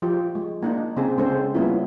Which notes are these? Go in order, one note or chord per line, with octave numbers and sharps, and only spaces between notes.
F3 F4 G4
G#3
A#3 D4 D#4
C#3 C4 G#4
C#3 G#3 C4 C#4 A4 C5
G3 A#3 B3 C#4 E4 F4